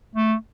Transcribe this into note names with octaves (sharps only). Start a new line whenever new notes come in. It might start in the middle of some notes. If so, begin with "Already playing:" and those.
A3